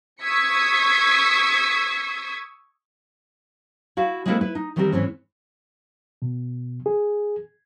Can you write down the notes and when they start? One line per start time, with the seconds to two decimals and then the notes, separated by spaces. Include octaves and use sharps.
0.22 C#6 D#6 E6 G#6 B6 C#7
3.97 E4 F#4 F5
4.26 G#3 A#3 C4 E4 A4 A#4
4.41 E4 B4
4.55 D#4
4.76 D#3 E3 G3 C4 G4 A#4
4.92 G#2 E3 C4 C#4
6.22 B2
6.86 G#4